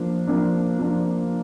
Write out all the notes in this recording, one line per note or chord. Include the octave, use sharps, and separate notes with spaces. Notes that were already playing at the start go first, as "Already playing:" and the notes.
Already playing: F3 A#3 D4
F3 A#3 D4
F3 A#3 D4